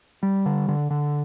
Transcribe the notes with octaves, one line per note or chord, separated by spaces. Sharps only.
G3
D3
D3
D3